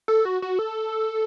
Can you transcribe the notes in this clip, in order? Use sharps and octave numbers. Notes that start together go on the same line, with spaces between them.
A4
F#4
F#4
A4